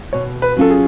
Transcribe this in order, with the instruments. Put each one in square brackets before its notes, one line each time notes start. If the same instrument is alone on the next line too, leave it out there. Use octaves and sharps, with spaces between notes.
[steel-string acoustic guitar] B2 [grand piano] C#5
[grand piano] B4
[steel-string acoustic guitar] F#3 C#4 F4 [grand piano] A4
[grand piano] G#4